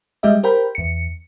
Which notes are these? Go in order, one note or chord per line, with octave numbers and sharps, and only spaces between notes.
G3 G#3 G4 D#5 E5
G4 A#4 C5 G5 B5
E2 C#7